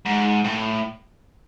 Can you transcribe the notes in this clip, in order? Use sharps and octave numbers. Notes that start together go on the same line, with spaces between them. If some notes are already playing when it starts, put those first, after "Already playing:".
G#2
A2